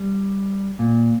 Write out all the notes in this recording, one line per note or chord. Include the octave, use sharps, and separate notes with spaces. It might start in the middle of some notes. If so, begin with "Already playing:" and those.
Already playing: G3
A#2